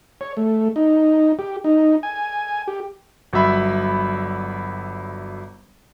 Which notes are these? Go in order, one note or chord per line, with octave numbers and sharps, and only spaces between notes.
C#5
A3
D#4
G4
D#4
G#5
G4
G1 F#3 G3 E5 B5